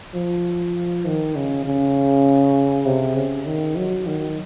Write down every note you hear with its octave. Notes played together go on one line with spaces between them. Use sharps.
F3
D#3
C#3
C#3
C3
C#3
D#3
F#3
D#3